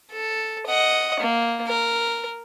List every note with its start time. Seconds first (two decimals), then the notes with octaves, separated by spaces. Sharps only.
0.12 A4
0.67 D#5 F#5
1.20 A#3
1.67 A#4